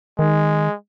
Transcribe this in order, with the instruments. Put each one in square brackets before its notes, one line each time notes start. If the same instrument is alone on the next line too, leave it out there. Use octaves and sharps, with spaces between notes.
[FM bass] D#3 [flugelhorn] G#3